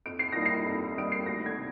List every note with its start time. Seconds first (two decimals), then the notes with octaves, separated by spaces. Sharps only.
0.06 F2 D7
0.19 C7
0.32 D#3 G3 A#3 D#4 A#6
0.46 C7
0.66 F2
0.96 D#3 G3 A#3 D#4 D7
1.12 C7
1.25 D2 A#6
1.46 G#6
1.55 C3